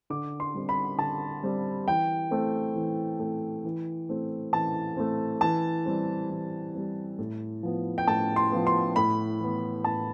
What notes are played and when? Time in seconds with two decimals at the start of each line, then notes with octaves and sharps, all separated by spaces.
0.10 D3 D6
0.40 C6
0.54 G3 C4
0.69 B5
0.98 D3 A5
1.43 G3 C4
1.88 E3 G5
2.31 A3 C4
2.76 E3
3.19 A3 C4
3.65 E3
4.09 A3 C4
4.53 E3 A5
4.97 A3 C4
5.41 E3 A5
5.86 G3 C4
6.30 E3
6.75 G3 C4
7.18 A2
7.63 F3 B3
7.98 G5
8.07 A2 A5
8.36 C6
8.52 F3 B3
8.67 C6
8.96 A2 B5
9.40 E3 B3
9.84 A2 A5